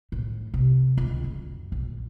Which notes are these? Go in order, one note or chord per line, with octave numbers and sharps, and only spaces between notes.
A2
C3
C#2
F#2
A#1